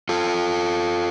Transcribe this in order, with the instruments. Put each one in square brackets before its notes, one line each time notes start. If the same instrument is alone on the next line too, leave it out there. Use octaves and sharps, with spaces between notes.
[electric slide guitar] F4 A4